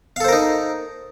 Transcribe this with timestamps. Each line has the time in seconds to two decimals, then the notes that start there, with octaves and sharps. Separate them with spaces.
0.16 F5
0.20 A4
0.24 C5
0.28 A#4
0.32 D#4